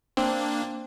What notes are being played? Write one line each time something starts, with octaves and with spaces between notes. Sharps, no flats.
A#3 C4 D4